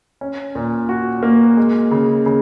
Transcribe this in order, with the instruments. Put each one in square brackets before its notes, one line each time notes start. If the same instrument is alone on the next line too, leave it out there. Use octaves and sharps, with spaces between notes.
[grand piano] C#4
A#2
F#4
A#3
G#3
C#3
C#3